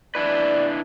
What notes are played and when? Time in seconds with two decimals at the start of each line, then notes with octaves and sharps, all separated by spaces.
0.15 D4 E4 B4 D5